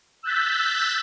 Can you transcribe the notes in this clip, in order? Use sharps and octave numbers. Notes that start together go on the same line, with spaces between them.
E6 F#6 G6 A6 B6